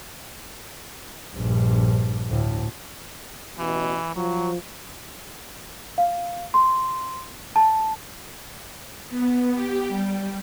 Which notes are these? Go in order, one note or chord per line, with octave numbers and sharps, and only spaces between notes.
A#1 G2
D2 A2
A1 B2 E3
F3 F#3
F5
C6
A5
B3
G4
G3